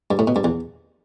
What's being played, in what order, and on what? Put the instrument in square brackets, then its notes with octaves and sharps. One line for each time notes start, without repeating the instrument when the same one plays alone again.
[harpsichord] G2
A2
B2
G2
E2